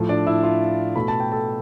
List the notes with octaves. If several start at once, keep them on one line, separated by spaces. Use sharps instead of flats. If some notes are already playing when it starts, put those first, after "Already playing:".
Already playing: A2 F3 A3
D4 D5
E4 E5
F4 F5
B2 A3 B5
A5
G5
A4 A5